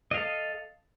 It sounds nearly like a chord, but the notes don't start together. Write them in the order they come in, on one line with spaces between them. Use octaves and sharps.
D#5 F5 A4